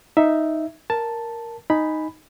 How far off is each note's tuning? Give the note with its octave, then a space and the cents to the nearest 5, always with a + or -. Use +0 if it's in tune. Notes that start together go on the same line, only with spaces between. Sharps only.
D#4 +5 E5 +0
A#4 +0 A5 +0
D#4 +0 G#5 +0 B5 +0